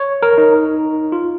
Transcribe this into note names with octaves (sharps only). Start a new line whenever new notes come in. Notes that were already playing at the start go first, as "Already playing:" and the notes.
Already playing: C#5
A#4
D#4
F4